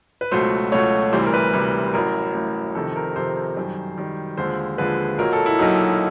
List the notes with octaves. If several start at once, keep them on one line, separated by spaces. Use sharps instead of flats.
B4
C#2 B2 F#3 A3 C5
C#2 B2 F#3 A3 C#5
D2 C3 E3 G3 C5
A#4
B4
D2 C3 E3 G3
A1 A2 F#3 A#4
A1 A2 F#3
F2 C3 D#3 A4
A#4
F2 C3 D#3 C5
F#2 D#3 G3
F#2 D#3 G3
D#2 D3 F3 G#3 C5
D#2 D3 F3 G#3 B4
B1 A#2 F#3 A#4
A4
E4
B1 A#2 F#3 D#4